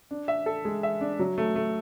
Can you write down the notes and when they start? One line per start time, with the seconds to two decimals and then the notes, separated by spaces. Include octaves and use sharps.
0.11 D4
0.28 E5
0.46 A4
0.65 G#3
0.83 E5
1.01 D4
1.19 F#3
1.38 A3
1.55 A3